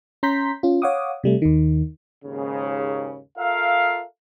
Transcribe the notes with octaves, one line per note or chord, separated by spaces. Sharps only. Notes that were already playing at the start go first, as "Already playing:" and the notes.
C#4 A#5 C6 G6 B6
C#4 F4
C#5 F5 F#5 D6 D#6
C3 G3 A3
D#2 D#3
D#2 G#2 C#3
F4 A4 A#4 E5 F5